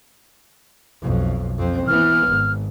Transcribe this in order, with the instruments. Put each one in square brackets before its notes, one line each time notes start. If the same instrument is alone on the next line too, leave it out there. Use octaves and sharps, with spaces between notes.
[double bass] B1 F2
F2 C4
[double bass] E3 B3 [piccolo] F6
[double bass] G#1